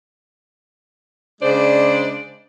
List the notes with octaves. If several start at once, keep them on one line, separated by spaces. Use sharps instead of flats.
C#3 G#3 D4 C5 D5